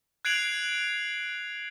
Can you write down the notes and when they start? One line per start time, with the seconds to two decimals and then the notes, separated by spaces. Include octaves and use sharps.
0.25 F#6 G#6 C7 D7 F7 F#7